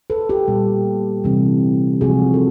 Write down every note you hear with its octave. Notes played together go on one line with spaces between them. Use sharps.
A4 B4
G4 A4
A#2 G3 B3
C3 E3 G3
C3 F3 G#3 F#4 G#4
A4